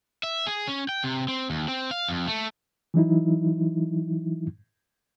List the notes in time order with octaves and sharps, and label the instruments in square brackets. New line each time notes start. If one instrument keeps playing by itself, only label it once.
[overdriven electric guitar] E5
G#4
C#4
G5
C3
C4
D#2
C4
F5
F2
A3
[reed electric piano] E3 F#3 D#4 E4